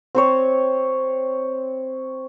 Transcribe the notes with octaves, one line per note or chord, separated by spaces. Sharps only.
C4 C5 C#5